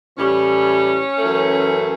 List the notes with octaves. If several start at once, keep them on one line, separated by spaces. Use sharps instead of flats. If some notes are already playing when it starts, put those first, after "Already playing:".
A2 E3 G3 C#4
F#2 E3 A3